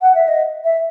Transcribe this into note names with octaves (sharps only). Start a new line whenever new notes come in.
F#5
E5
D#5
E5